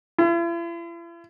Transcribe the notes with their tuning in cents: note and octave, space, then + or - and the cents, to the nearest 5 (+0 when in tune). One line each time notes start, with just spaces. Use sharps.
E4 +45